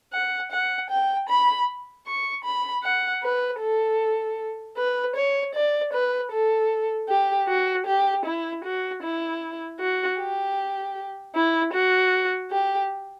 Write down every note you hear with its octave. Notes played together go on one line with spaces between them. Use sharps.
F#5
F#5
G5
B5
C#6
B5
F#5
B4
A4
B4
C#5
D5
B4
A4
G4
F#4
G4
E4
F#4
E4
F#4
G4
E4
F#4
G4